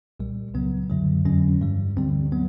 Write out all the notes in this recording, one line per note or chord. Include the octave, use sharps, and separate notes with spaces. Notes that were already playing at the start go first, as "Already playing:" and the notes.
C2 A#2 G3
C#2 C#3 F#3 B3
F#2 D3 F#3
F2 D3 F#3 C#4
G2 E3 G3
D2 D3 G3 C4
F#3 B3